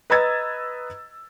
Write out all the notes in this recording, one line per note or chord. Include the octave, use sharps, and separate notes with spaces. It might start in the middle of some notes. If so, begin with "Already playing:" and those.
B4 D#5 A#5 E6 G#6 A6